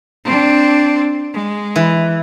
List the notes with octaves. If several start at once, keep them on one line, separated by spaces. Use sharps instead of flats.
C4 D4
G#3
E3